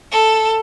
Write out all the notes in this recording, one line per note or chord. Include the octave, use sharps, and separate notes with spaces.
A4